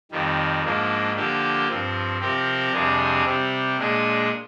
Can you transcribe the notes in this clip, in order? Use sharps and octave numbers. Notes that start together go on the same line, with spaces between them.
F2 D#3 G3
G#2 F3 A#3 D4
D3 F3 A#3 D4 G4
G2 F3 C4
C3 F3 C4 G4 A#4
F2 C3 G3 D4 G#4
C3 G3 C4
A#2 G#3 D4 G#4